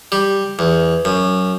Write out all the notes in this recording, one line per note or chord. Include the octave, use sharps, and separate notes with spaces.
G3
E2
F#2